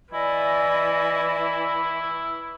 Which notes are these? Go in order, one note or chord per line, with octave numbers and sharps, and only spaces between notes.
E3 E4 D5 D#5 G#5